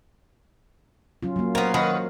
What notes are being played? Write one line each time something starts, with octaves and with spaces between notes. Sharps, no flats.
F#3 C#4 F4
F#3 A#3
B3 A#4 C5 C#5 F5
D#3 F#4 A#4 B4